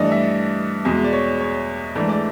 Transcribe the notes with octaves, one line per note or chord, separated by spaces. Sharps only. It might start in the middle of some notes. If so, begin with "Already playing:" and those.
Already playing: G2 E3 A3 D4 D5 D#5
E5
E2 B2 G#3
D5
C#5
C#5
G#2 E3 A3 D4
D5